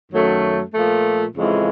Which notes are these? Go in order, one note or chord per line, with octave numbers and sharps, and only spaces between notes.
F#2 D#3 F#3 A3
A#2 F3 A3
F2 C#3 E3 G#3